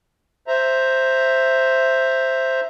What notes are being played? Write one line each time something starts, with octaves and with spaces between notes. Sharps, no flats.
C5 E5 A#5